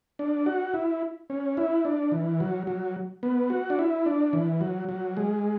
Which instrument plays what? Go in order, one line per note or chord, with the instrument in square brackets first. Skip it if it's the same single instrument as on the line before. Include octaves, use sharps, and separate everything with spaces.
[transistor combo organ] D4
F#4
E4
C#4
E4
D4
E3
F#3
F#3
B3
F#4
D4
E4
D4
E3
F#3
F#3
G#3